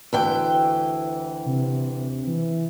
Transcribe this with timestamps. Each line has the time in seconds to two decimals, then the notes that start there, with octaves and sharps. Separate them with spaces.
0.13 D2 E3 G5
1.45 C3
2.27 E3